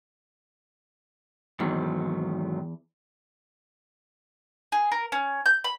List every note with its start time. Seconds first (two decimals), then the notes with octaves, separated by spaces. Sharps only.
1.60 E2 G#2 D#3 F#3
4.72 G#4
4.92 A#4
5.12 C#4
5.46 G6
5.64 B5